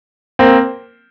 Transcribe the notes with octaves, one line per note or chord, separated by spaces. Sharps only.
A#3 C4